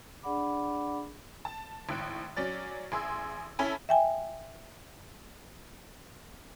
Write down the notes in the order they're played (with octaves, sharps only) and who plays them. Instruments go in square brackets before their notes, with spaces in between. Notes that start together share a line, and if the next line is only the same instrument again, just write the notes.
[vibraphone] D4 G#4 D5 F#5 B5 D6
[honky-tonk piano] A5
G#1 A2 F#6 D7
F#3 C#4 D5 A6
A1 G#4 C6 E6
C#4 E4 A4 E5 G#5 B5
[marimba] E5 G5 G#5